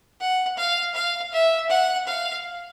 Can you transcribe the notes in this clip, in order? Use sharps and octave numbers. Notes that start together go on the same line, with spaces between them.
F#5
F5
F5
E5
F#5
F5